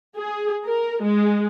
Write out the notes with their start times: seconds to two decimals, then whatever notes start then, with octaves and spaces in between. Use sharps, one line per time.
0.16 G#4
0.67 A#4
1.04 G#3